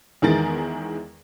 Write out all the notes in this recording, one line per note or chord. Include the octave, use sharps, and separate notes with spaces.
E2 D#3 E3 G#3 A#4 A6